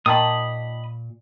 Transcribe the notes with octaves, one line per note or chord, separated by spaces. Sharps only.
A#2 D#3 A5 B5 D#6